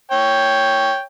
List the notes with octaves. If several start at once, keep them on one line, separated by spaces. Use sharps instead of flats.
C#5 G5